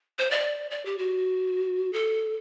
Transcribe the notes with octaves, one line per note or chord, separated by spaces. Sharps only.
C5
D5
D5
G4
F#4
A4